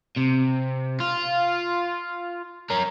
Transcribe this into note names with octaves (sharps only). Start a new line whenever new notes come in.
C3
F4
C#4 A#4